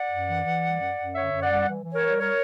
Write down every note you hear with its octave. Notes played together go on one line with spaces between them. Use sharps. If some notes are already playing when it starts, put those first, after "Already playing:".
Already playing: D5 F#5
F#2
E3
E3
G3
F#2
F#2
D3 C#5 E5
F#2
D5 F#5
G3
E3
E3
A#4 C#5
G3
A#4 C#5